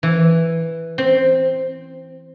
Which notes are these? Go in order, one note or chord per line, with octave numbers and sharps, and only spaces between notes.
E3
C4